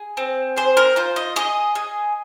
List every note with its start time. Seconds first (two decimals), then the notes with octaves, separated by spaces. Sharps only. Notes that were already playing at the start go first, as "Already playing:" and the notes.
Already playing: G#4
0.17 C4
0.57 G#4 C5
0.77 A#4
0.96 F4 C5
1.16 D#5
1.36 G#4 D#5
1.75 G#4